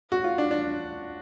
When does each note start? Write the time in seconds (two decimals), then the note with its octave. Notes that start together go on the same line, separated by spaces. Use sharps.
0.12 F#4
0.24 F4
0.38 D4
0.51 D4